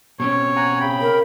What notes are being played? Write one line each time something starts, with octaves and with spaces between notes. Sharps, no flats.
B2 C4 C#4 C#5
F#5 G#5 A#5
C#3 G5 B5
A#4